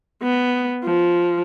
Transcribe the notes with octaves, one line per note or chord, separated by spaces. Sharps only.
B3
F3